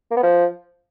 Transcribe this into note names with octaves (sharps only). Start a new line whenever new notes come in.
A#3
B3
F3